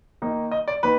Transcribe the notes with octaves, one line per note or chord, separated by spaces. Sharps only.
D#3 A#3 D#4
D#5
D5
D#3 A#3 D#4 B4